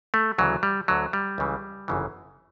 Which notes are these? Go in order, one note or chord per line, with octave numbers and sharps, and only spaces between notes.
A3
D2 C#3 E3 F#3
G3
D2 D3 F#3
G3
C#2 C#3 E3
G1 F#2 C#3 E3